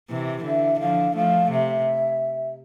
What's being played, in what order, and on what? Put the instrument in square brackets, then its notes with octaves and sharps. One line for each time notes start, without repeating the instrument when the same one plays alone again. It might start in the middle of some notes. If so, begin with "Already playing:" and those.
[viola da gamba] C3 E3
[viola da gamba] D3 [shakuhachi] E5
[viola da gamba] D3 F3 [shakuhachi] F5
[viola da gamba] F3 A3 [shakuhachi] F5
[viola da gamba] C3 [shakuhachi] E5